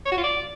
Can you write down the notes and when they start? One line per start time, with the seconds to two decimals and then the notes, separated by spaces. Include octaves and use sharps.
0.06 C#5
0.12 F#4
0.18 F4
0.23 D5